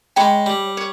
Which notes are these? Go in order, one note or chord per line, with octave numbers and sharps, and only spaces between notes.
G#3 C#5 G5 B5
G3
C#5